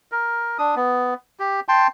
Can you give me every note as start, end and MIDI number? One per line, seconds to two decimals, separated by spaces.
0.12 0.58 70
0.59 0.75 62
0.59 0.75 87
0.76 1.14 59
1.39 1.60 67
1.68 1.87 79
1.68 1.87 81
1.68 1.87 84